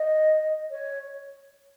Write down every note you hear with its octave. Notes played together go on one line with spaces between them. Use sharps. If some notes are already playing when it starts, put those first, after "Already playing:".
Already playing: D#5
C#5